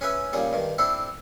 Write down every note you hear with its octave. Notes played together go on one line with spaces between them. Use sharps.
C#4 G#4 B4 E5
A#2 C#3 G3 G#4
G2 D#3
C4 D4 E4 A4